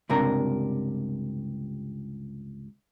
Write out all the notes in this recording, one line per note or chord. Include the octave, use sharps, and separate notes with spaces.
C#2 G2 C3 D4 A#4